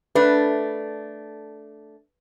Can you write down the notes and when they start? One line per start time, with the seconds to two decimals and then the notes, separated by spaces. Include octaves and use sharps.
0.15 A3 D4 B4